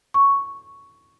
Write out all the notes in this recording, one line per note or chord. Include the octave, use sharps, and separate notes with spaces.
C#6